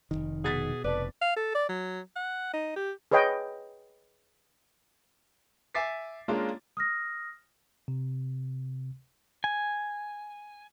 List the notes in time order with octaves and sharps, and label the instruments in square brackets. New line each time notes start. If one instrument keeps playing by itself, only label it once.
[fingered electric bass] F1 B1 D#3
[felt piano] B2 A6 B6 [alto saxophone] G#4 [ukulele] F#5
[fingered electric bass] F1 [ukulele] A4 D5 [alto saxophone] B4
[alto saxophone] F5
A4
D5
F#3
F#5
D#4
G4
[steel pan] G#4 B4 C#5 D#5 G5
[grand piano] E5 G#5 D6 A6 B6 C7
G#3 A#3 C#4 D4 F4
[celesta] D#6 F6 A#6
[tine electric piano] C3
[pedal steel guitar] G#5